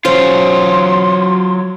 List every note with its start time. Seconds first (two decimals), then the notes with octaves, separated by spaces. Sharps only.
0.05 F#3 C#4 F4 C5 C6